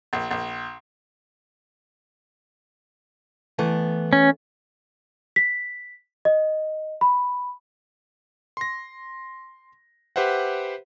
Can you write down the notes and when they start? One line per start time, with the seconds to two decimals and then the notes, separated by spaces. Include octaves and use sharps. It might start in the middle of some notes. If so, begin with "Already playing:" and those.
0.13 A#1
0.31 A#1
3.59 E3 A3 B3
4.13 C#4
5.36 B6
6.25 D#5
7.01 B5
8.57 C6 A#6
10.16 G4 B4 C5 E5 F#5